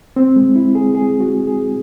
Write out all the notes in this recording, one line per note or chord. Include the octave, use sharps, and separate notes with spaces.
C4
G#3
E4
G#4
G#4
F#4
G#4